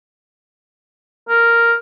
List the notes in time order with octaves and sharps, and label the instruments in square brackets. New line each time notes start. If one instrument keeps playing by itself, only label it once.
[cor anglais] A#4